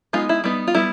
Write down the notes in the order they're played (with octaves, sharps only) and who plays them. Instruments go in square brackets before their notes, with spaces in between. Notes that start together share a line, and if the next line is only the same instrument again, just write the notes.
[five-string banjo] G#3 B3 D#4 F4
E4
G3 B3 D#4
F4
G3 B3 E4